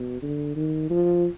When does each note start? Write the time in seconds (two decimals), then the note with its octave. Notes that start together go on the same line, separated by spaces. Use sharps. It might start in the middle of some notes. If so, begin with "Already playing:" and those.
Already playing: B2
0.22 D3
0.56 D#3
0.90 F3